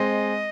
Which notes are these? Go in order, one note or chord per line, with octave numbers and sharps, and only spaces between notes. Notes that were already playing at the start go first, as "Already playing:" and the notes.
Already playing: G#3 C4 D#5